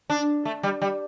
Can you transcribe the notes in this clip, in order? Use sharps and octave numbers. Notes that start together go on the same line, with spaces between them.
D4
A3
G3
G3